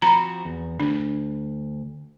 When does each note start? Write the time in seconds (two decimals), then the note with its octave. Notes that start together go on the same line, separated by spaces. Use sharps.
0.02 F3 C4 F#4 A#5 B5
0.45 E2
0.80 D2 D4